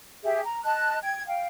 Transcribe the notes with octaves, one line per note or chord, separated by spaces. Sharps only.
G4 G#4 E5
A#5
D#5 A5 F#6
G5 G#6
F5 G5